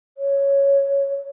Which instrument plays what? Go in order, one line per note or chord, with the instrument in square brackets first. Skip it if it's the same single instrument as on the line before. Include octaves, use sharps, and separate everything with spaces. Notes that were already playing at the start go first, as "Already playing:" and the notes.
[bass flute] C#5